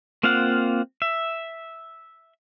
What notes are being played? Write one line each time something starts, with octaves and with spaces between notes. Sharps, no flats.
A#3 C4 F4 F5 F#5
E5